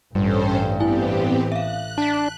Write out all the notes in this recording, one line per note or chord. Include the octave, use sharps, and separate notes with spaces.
A1 G2 G3 C#4 A4 C5
B3 C4 E4 G4 G#5
E5 F5 F#6
D4 A5 B6